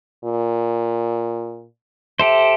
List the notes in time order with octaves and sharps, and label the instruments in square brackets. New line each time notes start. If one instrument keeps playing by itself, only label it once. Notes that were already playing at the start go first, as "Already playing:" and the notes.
[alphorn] A#2
[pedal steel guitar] G4 A4 C5 [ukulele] E5